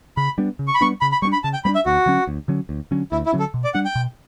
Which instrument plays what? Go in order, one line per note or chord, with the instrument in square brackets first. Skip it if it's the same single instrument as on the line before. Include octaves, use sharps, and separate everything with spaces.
[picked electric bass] C#3 [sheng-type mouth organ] B5
[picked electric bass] G3 B3 D4
C#3
[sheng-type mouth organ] C#6
B5
[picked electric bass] G3 B3 D4 [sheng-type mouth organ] C#6
[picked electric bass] C#3 [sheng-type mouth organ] B5
[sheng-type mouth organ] B5
[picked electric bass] G3 B3 [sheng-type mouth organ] C#6
[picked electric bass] D4
[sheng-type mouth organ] B5
[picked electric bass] C#3 [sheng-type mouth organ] A5
[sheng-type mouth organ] G5
[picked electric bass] G3 B3 [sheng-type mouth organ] B5
[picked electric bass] D4
[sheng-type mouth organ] E5
[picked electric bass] D2 [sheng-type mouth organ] F#4
[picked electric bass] D3 F#3 C#4
D2
D3 F#3 C#4
D2
D3 F#3 C#4
[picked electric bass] D2 [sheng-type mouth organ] E4
[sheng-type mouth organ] E4
[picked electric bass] D3 F#3 C#4
[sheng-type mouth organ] A4
[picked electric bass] B2
[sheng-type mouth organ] D5
[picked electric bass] G3 D4 [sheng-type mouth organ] F#5
[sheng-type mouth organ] G5
[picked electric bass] B2